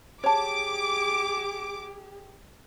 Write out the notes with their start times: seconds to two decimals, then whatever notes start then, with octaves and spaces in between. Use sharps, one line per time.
0.24 G4 G#4 C#5 A5 D6